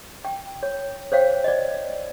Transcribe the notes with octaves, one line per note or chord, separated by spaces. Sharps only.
G5
C#5
C5 C#5 F5 G5
D5 D#5